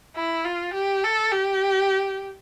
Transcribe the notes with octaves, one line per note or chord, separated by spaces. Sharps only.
E4
F4
G4
A4
G4